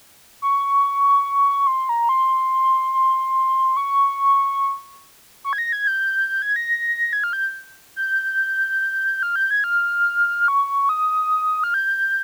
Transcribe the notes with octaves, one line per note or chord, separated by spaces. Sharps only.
C#6
C6
A#5
C6
C6
C#6
C#6
G#6
A#6
G#6
G6
G6
G#6
A#6
G#6
F6
G6
G6
F6
G6
G#6
F6
C#6
D#6
F6
G6